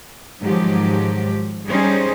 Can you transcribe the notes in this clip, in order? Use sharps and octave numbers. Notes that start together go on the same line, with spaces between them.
G#2 D#3 F3 F#3 G4
G3 C#4 D#4 G#4 C5